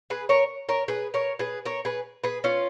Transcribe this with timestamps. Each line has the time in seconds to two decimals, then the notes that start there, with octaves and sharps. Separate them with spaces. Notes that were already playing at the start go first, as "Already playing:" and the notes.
0.10 G#4 B4
0.29 A#4 C#5
0.69 A#4 C#5
0.88 G#4 B4
1.14 A#4 C#5
1.39 G#4 B4
1.65 A#4 C#5
1.85 G#4 B4
2.24 G#4 B4
2.44 C#4 F4